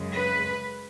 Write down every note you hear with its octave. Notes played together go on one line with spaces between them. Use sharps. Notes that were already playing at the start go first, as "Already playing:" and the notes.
Already playing: F#2 C#3 G#3
B4